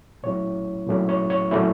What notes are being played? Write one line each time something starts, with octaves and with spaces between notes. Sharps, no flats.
A#2 F#3 A3 C#4 E4 C#5
A#2 F#3 A3 C#4 E4
C#5
C#5
A#2 F#3 A3 C#4 E4